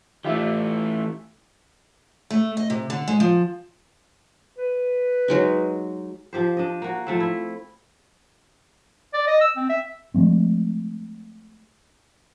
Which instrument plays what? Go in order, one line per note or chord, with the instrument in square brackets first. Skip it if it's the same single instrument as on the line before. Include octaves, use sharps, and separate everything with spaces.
[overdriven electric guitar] E3 A3 [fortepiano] E4 F4 G4
[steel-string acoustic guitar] A3
D#5
C3
D3
G#3
F3
[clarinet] B4
[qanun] F#3 G#3 D#4
[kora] F3 G4 C5
D4 D#5
A#3 F#4
F3 A3 C4
E4
[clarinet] D5
D#5
E6
C4
E5
[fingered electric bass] F3 G#3 A3 C4